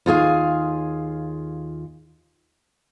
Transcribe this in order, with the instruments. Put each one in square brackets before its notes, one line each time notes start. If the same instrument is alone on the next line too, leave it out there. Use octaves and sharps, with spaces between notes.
[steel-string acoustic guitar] D#2 F4 G#4 F5